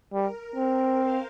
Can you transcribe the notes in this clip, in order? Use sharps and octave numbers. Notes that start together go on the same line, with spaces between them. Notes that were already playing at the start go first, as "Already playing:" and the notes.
G3 A#4
C4
C5 F5